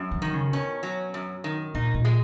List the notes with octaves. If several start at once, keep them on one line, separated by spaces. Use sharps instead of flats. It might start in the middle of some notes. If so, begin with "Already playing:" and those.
Already playing: F#2
E3
D#3
C#3
B2 C#4
F#3
F#2
D#3
A#2 D#4
A#2
G#3